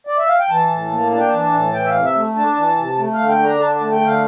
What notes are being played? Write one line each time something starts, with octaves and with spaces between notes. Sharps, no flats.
D5
E5
F5
G5
E3 A5
A2
A#3
D4 A5
G5
E3 A5
A2
E3 G5
E5
F5
C3
E5
A3
D4 A5
E3
C3
A3
F5
D3
G5
D4
A#5
D3 A5
A5
A3
G5
D3
F5